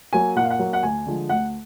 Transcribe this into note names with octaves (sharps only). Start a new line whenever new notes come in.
F#3 A#3 G#5
A#2 F#5
F5
F#5
F#3 A#3
F#5
D2 G#5
D3 F3 G#3
D2 F#5